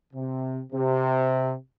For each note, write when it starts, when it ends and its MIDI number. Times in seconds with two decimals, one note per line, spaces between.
0.13 0.61 48
0.72 1.52 48